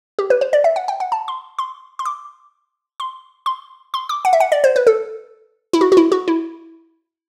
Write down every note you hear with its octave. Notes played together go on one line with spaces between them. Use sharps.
G4
B4
C5
D5
E5
F#5
G5
F#5
A5
C6
C6
C6
D6
C6
C6
C6
D6
F#5
E5
F#5
D5
C5
B4
A4
E4
F#4
F#4
E4
F#4
E4